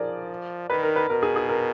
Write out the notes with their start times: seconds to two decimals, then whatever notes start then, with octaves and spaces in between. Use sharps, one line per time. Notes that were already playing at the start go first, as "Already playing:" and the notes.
Already playing: F3 G#4 A#4 D5
0.70 D#3 B4
0.83 A#4
0.96 B4
1.10 B2 A#4
1.23 G#4
1.36 G#4
1.49 A#4